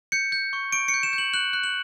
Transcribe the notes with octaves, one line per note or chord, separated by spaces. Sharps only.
G6 C#7
G6
C#6
C#6 D7
C#7
G6
E7
G6
F#7
F#6 F#7
F#6
F#7